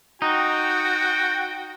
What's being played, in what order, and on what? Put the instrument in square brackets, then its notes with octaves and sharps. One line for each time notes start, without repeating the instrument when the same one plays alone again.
[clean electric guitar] D#4 [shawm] F#4 [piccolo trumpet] G5